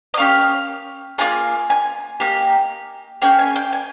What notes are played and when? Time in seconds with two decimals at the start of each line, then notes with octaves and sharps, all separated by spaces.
0.14 D#5
0.17 A#3 C#4 G4 F5
1.18 A#3 F4 G#4 G#5
1.70 G#5
2.20 A#3 D#4 G4
3.22 A#3 C#4 G#4 G5
3.39 G#5
3.56 G5
3.73 G#5